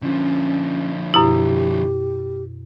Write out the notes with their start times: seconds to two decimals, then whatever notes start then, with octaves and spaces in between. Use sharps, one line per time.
0.02 D3 F3 C#4
1.14 F#2 B2 E4 G4